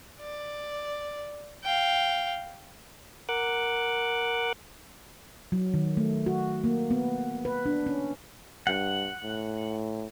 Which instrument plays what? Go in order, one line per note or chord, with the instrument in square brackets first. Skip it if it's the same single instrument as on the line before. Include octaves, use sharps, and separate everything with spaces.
[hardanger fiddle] D5
F5 G5
[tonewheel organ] A#4 F#5 D6 F#6
[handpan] F#3
D#3
A3
F#4
A#3
B3
B4
D4
C#4
[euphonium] G2 [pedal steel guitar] F#5
[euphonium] A2